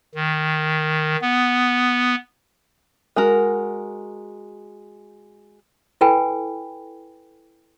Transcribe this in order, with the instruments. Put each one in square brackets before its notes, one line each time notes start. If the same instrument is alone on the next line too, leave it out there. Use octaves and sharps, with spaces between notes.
[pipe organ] D#3
B3
[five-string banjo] G#3 F#4 A#4
[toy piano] E4 A4 B4 G5 G#5 B5